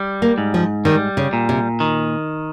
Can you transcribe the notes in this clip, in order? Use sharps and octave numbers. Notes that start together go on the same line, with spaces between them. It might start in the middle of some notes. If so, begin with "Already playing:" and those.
Already playing: G3
A#3
G#2
F3
D#3 G3
C#3
A#2
C3
D#3